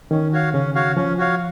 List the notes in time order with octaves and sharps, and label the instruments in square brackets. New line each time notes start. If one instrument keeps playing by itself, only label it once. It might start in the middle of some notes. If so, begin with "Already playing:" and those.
[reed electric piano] D#3 [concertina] C#4
[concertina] F#4 C#5 F5
[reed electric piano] C#3 [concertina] C#4
[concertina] F#4 C#5 F5
[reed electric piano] F3 [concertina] C#4
[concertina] F#4 C#5 F5